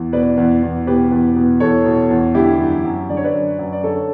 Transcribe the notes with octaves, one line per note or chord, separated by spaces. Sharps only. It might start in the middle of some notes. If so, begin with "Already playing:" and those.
Already playing: E2
B2 B4 D5
E2
E2
B2 G4 B4
E2
B2
E2 A4 C#5
B2
E2
D3 E4 G4
F#2
F#2
D3 D5
C#5
B4 D5
F#2
F#2
D5
D3 A4 C#5